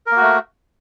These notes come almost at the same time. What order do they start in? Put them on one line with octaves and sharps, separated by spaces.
A#4 A#3 F#4 A3